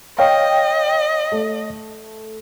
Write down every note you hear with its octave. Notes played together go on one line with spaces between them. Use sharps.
C#5 D#5 F5 G5
A3